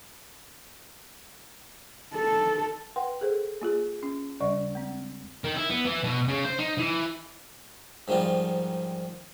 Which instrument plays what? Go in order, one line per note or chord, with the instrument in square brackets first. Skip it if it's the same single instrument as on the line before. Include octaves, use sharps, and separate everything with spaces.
[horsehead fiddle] A4
[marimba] B4 F#5 G5 C6
G#4 A4 C5
A#3 F4 G#4
C#4
D#2 C#3 G3 D5 C#6
G#3 C4
[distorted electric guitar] D#3
E4
B3
E3
B2
C#3
C5
D#4
E3
[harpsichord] G#2 D#3 F3 G3 F4